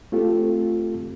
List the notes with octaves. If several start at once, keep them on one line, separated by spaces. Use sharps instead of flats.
A3 C4 F4 G4 A4